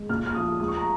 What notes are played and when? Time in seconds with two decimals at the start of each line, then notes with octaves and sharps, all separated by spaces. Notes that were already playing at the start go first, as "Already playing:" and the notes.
Already playing: G#3
0.09 A#2 F6
0.26 F6
0.34 F3 D#6
0.60 G#3 D#6
0.68 C#6
0.76 A#5